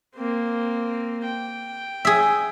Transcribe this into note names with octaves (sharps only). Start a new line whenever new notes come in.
A#3 C4
G5
G#4 E5